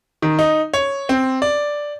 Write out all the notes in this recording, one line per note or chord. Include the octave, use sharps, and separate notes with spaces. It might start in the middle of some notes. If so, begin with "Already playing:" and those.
D#3
D#4
C#5
C4
D5